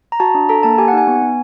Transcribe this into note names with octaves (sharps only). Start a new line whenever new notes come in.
A#5
F#4 A5
D4
A4 A#5
A#3 A5
G4 G#5
F#5
D#4 G#5
B3
B3